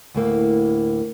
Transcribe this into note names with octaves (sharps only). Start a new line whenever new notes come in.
D2 A2 A#3